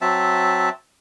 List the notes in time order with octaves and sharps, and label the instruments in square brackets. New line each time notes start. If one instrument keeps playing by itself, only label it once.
[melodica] F#3 C4 E5 A5